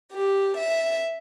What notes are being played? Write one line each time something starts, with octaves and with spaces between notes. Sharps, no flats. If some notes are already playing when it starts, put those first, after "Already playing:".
G4
E5